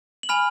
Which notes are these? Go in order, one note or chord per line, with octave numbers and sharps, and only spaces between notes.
F#7
G#5 B5 F6 F7